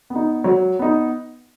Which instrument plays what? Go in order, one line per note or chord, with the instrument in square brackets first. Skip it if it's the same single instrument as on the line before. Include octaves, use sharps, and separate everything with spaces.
[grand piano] B3
D#4
F#3
B3 D#4